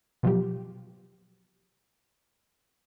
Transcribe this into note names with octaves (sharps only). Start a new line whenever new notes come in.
B2 F3 F#3 G4